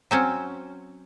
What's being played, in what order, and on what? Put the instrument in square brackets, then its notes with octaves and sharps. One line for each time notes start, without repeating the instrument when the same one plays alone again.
[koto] F#3 C4 C#4